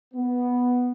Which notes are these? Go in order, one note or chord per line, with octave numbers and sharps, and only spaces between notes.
B3